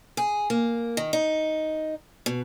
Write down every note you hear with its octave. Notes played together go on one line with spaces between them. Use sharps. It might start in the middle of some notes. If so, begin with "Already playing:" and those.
G#4
A#3
D#3
D#4
B2